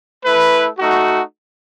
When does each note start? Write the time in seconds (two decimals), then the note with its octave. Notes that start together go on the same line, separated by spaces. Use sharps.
0.24 A3 E4 B4
0.78 A3 D#4 F#4